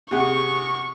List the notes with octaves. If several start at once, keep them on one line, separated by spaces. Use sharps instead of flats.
C3 G#4 F#5 C#6